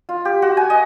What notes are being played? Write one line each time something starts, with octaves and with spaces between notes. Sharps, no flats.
F4
G4
F#4
G#5
D#5